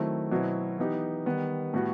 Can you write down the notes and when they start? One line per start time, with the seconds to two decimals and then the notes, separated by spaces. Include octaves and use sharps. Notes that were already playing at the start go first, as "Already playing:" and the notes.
Already playing: D#3 F#3 A3 C4 E4
0.31 B2 F#3 C4 E4
0.78 E3 B3 D#4 G4
1.26 D#3 G3 B3
1.74 A2 G3 B3 F#4